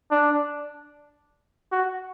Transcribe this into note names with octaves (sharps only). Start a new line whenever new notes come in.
D4
F#4